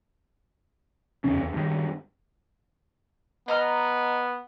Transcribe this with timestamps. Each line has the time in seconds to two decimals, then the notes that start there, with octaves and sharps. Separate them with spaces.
1.24 F1 E2 C#3 C#4
1.39 E2
1.53 G2 D#3
3.48 B3 D#5 A#5 F6